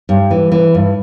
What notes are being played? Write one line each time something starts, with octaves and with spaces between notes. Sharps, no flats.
G2
E3
E3
G2